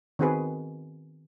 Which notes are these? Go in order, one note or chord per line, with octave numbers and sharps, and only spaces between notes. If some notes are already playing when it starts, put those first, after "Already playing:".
D#3 B3 C4 F#4 G#4 B4